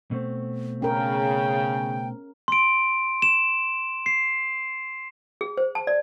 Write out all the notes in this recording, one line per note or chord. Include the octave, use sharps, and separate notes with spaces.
B2 A3 C4
C#3 C#4 A#4 G5
C6 D7
E7
C7
G#4
C5
A5
D5